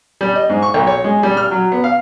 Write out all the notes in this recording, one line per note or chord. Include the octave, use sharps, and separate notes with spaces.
G3
D#5
G#2
C#6
B1
C#5
G#3
G3
F6
F#3
B3
F5